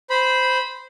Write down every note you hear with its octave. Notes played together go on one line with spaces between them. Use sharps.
C5 B5